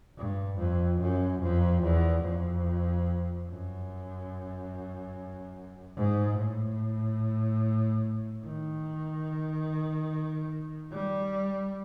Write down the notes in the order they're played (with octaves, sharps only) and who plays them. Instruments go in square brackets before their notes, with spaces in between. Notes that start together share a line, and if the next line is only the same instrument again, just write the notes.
[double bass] G2
F2
F#2
F2
E2
F2
F#2
G#2
A2
D#3
G3